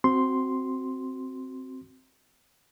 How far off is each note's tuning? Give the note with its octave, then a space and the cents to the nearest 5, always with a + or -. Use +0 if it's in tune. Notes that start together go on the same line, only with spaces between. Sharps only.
C4 +0 F#4 +10 C6 +0